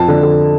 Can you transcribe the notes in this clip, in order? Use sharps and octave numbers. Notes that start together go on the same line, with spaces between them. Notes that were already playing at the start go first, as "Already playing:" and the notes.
Already playing: F2 A5
D3
D3